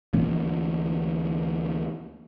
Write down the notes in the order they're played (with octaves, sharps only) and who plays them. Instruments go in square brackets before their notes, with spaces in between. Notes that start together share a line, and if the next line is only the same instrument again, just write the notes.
[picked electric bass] D2 E3 A#3 C#4